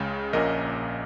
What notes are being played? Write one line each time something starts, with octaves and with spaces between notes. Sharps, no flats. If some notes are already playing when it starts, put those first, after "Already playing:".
Already playing: C#2 C#3 G#3
A#1 A#2 A#3 C#4 A#4 D#5